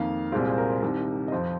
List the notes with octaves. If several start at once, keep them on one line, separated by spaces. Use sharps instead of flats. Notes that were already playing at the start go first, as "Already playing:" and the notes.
Already playing: F2 D#3 A#3 F5
C2 A#2 G#3 C4 F4
G#4
C5
A#4
C5
C2 C3 D#3
D#5
F2 F3 C4 C5